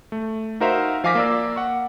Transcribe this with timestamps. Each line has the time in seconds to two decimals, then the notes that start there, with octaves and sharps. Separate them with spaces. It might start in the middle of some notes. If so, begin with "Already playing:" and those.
0.12 A3
0.60 D#4 F#4 A#4 C5 E5 F5
1.04 F3 F5 G#5 D6 A#6 B6
1.15 A#3 D5 E6
1.56 F#5 C#6